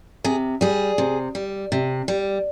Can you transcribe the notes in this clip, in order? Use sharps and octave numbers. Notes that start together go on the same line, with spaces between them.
C3 G#4
G3 G#4
C3
G3
C3
G3